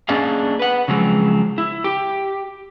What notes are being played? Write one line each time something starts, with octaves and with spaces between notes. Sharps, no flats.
A#3 C#4 D4 G#4 D#5 F5
B4 F#5
C#3 F3 F#3 G#3 C4
E4
G4